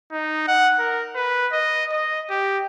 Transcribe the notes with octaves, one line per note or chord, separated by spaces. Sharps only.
D#4
F#5
A#4
B4
D#5
D#5
G4